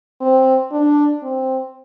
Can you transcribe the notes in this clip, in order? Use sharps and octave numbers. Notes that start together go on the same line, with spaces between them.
C4
D4
C4